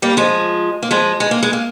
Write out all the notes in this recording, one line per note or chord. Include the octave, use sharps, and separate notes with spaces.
G3 A#3
F3 G#3
A#3
F3 G#3
G#3
A#3
G#3
A#3